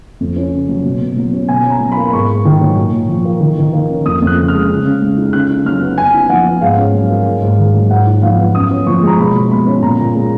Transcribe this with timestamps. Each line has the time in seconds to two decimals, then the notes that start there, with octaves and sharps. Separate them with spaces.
0.20 F2
0.36 C#4
0.53 C#3
0.69 F#3
0.85 B2
1.01 B2
1.17 F#3
1.33 C#4
1.48 B2 G#5
1.65 C#4
1.70 A#5
1.80 F#3
1.92 A#3 B5
2.07 B5
2.13 G#2 C#6
2.29 A#3
2.45 D#3
2.61 F#3
2.77 A#2
2.93 A#2
3.09 F3
3.25 A#3
3.41 D#3
3.58 D#3
3.73 A#3
3.89 C#4
4.06 F2 D#6
4.22 F2
4.27 F#6
4.38 C#3
4.48 F6
4.54 G#3
4.70 C#3
4.85 C#3
5.01 G#3
5.17 D#4
5.33 C#3 F#6
5.50 D#4
5.65 F#3 F6
5.81 B3
5.98 F#2 G#5
6.14 D#4
6.29 F3 F#5
6.45 B3
6.61 G#2 F5
6.78 C#4
6.94 F#3
7.10 A#3
7.26 G#2
7.42 G#2
7.58 D#3
7.74 F#3
7.90 G#2 F#5
8.06 D#4
8.22 F3 F5
8.39 B3
8.55 F#2 D#6
8.71 C#4
8.86 F3 C#6
9.03 G#3 A#5
9.18 B2 B5
9.35 B2
9.51 G#3 B5
9.66 C#4
9.82 A#2 A#5
9.99 A#2
10.15 G#3